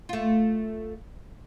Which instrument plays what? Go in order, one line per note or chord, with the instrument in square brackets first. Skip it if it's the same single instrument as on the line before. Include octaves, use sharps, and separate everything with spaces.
[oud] A3 F4